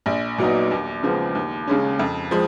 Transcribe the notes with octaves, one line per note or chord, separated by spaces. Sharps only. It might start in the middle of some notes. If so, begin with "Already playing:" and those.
A#1
A#2 F#3 B3 D#4
D#2
C#3 F3 G#3 B3
D#2
C#3 G#3 C#4
F2
F3 G#3